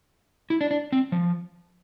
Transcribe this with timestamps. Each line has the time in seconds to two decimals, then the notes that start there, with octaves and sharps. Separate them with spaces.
0.50 E4
0.61 D4
0.71 D4
0.92 C4
1.12 F3